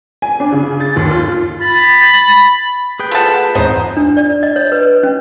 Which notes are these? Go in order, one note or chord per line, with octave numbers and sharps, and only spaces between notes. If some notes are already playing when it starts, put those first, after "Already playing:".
G#5
D4
C#3
A6
D#2
F4
F4
B5 A6
G#4 B4 G5
A3 F4 F#5 A5
E2 G#2 C4 D#4 C5 A#5
D4
D5
D#5
C#5
B4
C#4